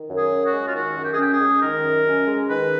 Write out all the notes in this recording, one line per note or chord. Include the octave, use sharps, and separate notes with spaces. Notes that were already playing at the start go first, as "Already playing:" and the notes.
Already playing: D#3
F#2
G#4
C#4
F#4
G#3
F4
D#3 F#4
F#2
G4
G#4
C#4 G4
G#4
G#3
D#3 A#4
F#2
C#4
G#3
D#3 B4